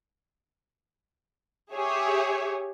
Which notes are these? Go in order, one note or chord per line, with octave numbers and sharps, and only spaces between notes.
G4 G#4 C#5 E5